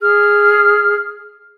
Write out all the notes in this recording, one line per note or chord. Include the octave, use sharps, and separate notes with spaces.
G#4 F6